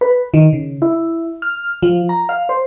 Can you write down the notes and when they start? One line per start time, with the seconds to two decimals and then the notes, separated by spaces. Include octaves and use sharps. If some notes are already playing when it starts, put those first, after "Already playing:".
0.01 B4
0.34 D#3
0.53 C#3
0.82 E4
1.42 F6
1.83 F3
2.09 A#5
2.29 F5
2.49 C5